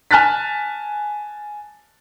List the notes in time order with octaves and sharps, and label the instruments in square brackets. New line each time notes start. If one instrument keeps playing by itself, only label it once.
[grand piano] G#5 A5 F6 F#6 A6 B6